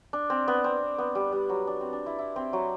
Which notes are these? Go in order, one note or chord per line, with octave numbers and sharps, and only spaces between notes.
D4
C4
B3
C4
B3
G3
G3
F#3
D4
C4
D4
E4
E4
C4
F#3